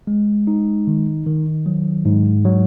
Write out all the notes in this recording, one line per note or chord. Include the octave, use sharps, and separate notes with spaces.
G#3
D#4
D#3
D#3
F#3
G#2
F#3